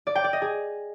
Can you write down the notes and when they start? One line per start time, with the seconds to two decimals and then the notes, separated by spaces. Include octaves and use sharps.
0.07 D5
0.15 G5
0.24 D5
0.33 D#5
0.42 G#4